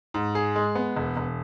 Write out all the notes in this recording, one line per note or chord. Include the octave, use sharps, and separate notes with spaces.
G#2
G#4
G#3
B3
E1
E1